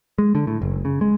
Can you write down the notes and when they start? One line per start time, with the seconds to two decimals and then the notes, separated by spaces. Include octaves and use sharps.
0.18 G#3
0.35 D3
0.47 A2
0.62 F#1
0.85 C#3
1.01 G#3